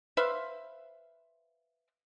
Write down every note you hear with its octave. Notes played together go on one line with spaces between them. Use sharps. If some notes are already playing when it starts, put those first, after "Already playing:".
B4 C5 E5 F5